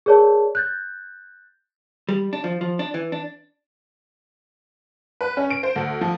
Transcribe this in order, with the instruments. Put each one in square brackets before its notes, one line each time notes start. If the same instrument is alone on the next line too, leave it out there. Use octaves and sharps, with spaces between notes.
[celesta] G#4 A#4 C#5 D5 A5
F#6 G6 A6
[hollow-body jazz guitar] G3
D4
F3
F3
D4
E3
D4
[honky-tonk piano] B4
C#4
D7
C5
D2
F3